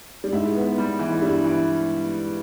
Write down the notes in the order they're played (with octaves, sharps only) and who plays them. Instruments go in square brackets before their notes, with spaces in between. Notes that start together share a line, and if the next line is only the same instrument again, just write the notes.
[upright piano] G3
[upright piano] G#2 G#3 [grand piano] E4
[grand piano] B3
G3
E3
[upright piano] G#3
[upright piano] G2 G3 [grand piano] E4
[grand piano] E3